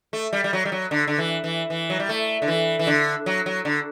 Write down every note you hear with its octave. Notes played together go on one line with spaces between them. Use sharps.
A3
G3
G3
F#3
G3
F#3
D3
D3
E3
E3
E3
F#3
G3
A3
D3
E3
E3
D3
F#3
F#3
D3